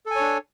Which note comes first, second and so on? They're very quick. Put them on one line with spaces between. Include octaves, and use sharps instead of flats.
A4 G#5 C#5 D4